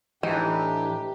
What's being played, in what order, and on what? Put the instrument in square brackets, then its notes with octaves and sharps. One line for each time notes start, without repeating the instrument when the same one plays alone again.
[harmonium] A2 D4 [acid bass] E3 [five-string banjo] D#4 [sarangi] G4